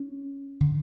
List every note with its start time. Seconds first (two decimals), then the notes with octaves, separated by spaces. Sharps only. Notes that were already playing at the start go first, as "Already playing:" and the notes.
Already playing: C#4
0.61 D3